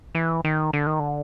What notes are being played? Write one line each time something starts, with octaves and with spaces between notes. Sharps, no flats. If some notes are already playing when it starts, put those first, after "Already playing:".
E3
D#3
D3
D#3
D3